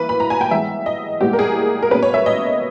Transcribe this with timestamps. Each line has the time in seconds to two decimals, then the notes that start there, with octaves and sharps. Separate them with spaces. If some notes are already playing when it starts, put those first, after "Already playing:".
Already playing: E3 A#3 E4 B4
0.09 B5
0.20 A#5
0.30 G#5
0.41 G5
0.51 E3 G#3 B3 E5
0.86 D#5
1.21 A#2 G#3 B3 E4 G4
1.33 A#4
1.39 G#4
1.82 A#4
1.91 B2 A#3 C#4 B4
2.03 C#5
2.14 E5
2.26 D#5